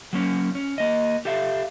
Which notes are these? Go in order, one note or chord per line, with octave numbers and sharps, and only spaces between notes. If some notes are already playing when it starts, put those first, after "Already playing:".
F#3 A#3 C#4
C#4
A#3 D#5
G4 A4 E5 F5